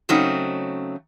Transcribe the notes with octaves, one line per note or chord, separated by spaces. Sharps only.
C#3 F#3 A3 C4 C#4 D#4